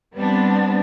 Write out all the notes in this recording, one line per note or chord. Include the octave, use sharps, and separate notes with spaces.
G3 B3 C4 D4